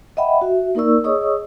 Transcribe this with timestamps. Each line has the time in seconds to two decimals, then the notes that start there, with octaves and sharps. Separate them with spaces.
0.17 D#5 E5 F#5 G5 B5
0.41 F#4 E5
0.75 A#3 D#4 A#4 D5 C#6 E6
1.04 G#4 C#5 D#5 C#6 D#6 E6